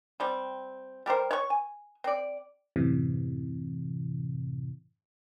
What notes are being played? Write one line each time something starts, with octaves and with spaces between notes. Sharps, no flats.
G3 C4
G3 G4 A#4 C5
C#5 C#6
G#5
C4 D5
F#2 A2 C3 E3